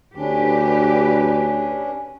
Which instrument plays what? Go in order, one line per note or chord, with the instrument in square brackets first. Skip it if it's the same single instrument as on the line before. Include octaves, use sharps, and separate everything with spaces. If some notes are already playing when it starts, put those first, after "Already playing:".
[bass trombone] D2 [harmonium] C#4 D4 [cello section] G4 B4